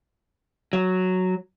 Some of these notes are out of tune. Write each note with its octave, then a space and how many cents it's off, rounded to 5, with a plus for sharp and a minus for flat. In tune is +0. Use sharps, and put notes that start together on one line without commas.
F#3 +0